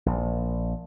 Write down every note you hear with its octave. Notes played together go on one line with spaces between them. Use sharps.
A#1